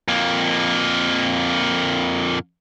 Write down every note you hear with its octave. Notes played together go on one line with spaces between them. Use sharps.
F2 A#3